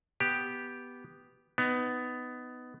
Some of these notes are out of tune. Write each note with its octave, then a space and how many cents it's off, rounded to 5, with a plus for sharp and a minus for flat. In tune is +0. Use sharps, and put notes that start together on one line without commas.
B3 +0 G4 +0
B3 +15 D#4 +0